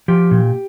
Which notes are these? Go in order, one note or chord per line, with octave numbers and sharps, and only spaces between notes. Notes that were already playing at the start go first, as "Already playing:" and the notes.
F3 G4
A#2